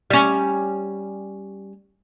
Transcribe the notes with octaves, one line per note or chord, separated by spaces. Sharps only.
G3 C#4